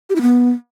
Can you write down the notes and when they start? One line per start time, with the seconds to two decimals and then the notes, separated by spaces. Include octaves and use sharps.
0.10 G4
0.16 E4
0.22 B3